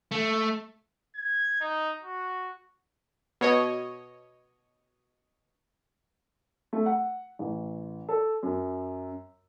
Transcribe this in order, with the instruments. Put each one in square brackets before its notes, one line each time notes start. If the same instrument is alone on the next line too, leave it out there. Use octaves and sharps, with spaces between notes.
[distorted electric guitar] A3
[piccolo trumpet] G#6
D#4
F#4
[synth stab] B2 C#5 D#5
[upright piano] A3
F#5
A1
A4
F#2